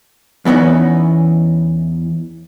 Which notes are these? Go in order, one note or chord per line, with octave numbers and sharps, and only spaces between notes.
E2 E3 B3 C#4 D#4